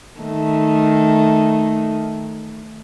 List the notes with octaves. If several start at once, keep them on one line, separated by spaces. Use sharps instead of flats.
D#3 A3